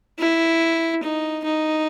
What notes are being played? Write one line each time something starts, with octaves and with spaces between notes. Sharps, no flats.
E4
D#4
D#4